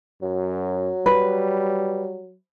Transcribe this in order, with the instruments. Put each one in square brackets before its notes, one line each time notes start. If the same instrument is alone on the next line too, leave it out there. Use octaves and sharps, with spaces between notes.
[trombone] F#2 [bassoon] F#3
[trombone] G3 [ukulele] B4